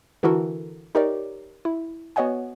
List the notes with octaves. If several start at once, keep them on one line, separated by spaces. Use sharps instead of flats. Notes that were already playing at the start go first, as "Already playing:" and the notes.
D3 E3 E4 F#4 A4 A#4
D#4 G4 A#4 C#5 D5
E4
B3 F#4 C#5 D#5 F#5 G#5